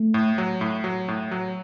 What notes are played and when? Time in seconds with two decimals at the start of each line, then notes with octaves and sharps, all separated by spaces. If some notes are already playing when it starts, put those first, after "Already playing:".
Already playing: A3
0.14 A2
0.38 F#3
0.61 A2
0.84 F#3
1.08 A2
1.31 F#3